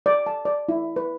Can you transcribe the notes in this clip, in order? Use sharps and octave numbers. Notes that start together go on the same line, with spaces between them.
D5
A5
D5
E4
B4